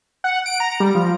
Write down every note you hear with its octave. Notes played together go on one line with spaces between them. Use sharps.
F#5
D7
A#5
G3
F3